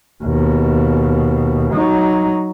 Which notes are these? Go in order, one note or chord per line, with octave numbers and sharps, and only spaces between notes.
D#2 B2
F#3 D#4